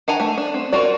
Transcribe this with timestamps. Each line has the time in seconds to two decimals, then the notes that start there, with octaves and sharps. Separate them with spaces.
0.08 D4 F#5 G#5 A#5
0.20 A3
0.38 D4
0.54 C4
0.72 F4 F#4 A#4 D5